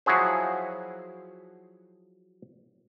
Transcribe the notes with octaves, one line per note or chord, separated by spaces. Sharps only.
F3 F#3 E4 F#4 G#4 C5